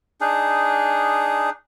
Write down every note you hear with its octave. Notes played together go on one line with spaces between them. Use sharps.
D4 D#4 G#4